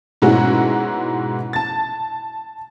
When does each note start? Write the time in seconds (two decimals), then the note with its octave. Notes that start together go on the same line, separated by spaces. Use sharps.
0.22 G#2 B2 G#3 C#4 E4 F#4
1.53 A5 A6